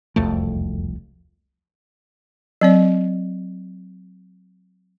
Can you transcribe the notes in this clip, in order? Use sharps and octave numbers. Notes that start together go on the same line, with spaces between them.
E1 C2 F2 A3
F#3 C4 D5